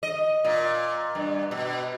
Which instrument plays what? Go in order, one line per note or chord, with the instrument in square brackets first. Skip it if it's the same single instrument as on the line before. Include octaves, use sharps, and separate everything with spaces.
[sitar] D#5
A#2
G2
B2